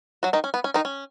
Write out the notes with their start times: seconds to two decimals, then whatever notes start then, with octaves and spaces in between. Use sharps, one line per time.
0.23 F#3 F#4
0.33 D#3 D#4
0.44 C#4
0.54 B3
0.64 C#4
0.74 D#3 D#4
0.85 C#4